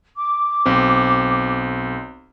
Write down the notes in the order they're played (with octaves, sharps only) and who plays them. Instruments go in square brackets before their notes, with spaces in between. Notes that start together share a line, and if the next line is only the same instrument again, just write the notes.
[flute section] D6
[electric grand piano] B1 C4